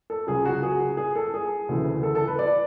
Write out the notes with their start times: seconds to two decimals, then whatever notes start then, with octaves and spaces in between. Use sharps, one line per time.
0.10 A4
0.27 C#2 C#3 F#3 G#4
0.45 F#4
0.63 G#4
0.97 G#4
1.16 A4
1.34 G#4
1.69 D2 C#3 E3 A3
2.03 A4
2.15 A4
2.27 B4
2.39 D5